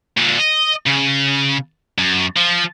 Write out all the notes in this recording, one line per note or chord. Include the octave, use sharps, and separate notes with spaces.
A#2 D3
D#5
C#3
F#2
F3